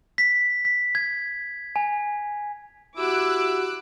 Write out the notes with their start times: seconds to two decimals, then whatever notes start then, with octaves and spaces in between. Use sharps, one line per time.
0.18 B6
0.65 B6
0.95 G#6
1.76 G#5
2.97 E4 F#4 G4 F#5 D6 E6 F#6